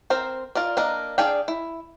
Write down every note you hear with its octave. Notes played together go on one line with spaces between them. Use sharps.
C4 A#4 C5
F4 A#4 D5
A#3 D4 A#4 D#5
D4 G#4 D5 F5 G5
E4